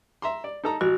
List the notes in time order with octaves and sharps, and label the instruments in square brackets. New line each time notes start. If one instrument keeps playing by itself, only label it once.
[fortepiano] E5 A#5 C6
D5
D#4 A4 A#5
[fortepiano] A1 [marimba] F#4